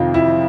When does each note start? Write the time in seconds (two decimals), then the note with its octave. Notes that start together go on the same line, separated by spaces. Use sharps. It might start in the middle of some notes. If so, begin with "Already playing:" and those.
Already playing: F2 C3 D#3 F4
0.14 E4